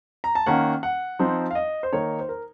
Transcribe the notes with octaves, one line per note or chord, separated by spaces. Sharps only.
A#5
A5
D#3 A#3 C#4 F#5
F#5
F3 C4 D#4
F5
D#5
C5
D#3 A#3 D#4 C#5
C5
A#4